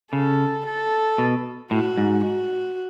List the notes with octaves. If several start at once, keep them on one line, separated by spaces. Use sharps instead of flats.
C#3 A4
A4
B2
A2 F#4
G#2
F#4